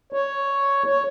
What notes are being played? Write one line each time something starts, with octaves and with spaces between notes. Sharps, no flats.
C#5
C#5